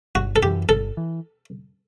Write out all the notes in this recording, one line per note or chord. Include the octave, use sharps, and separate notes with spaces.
G1 F#4
A4
F#2 E3 G4
G1 A4
E3